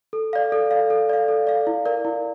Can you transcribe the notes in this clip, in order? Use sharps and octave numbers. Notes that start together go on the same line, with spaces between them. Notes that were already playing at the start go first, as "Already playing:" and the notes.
A4
D5 F5
A4
D5 F5
A4
D5 F5
A4
D5 F5
E4
A#4 D5 F5
E4